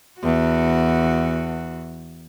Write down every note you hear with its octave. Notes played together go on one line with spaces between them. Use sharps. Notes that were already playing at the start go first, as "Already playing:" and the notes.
E2 F#4